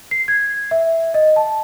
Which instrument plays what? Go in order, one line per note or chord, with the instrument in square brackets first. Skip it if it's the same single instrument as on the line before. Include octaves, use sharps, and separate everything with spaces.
[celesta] C7
G#6
E5
D#5
A5